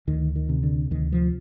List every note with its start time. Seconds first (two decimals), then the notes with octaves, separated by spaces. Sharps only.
0.07 D2 D#3
0.36 D#3
0.49 C3
0.63 D3
0.91 D2 D#3
1.13 F3